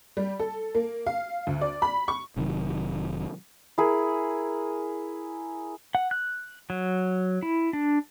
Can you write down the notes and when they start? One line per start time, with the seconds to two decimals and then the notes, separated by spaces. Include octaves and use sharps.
0.17 G3
0.40 A4
0.75 A#3
1.07 F5
1.47 D2
1.61 D5
1.82 B5
2.08 C#6
2.37 F1 C3 D#3 F#3
3.78 E4 G#4 A#4
5.95 F#5
6.11 F#6
6.70 F#3
7.43 E4
7.73 D4